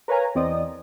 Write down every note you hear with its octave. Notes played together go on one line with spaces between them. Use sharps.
A#4 B4 C#5 F5 G#5 A#5
E2 C4 D5 D#5 D#6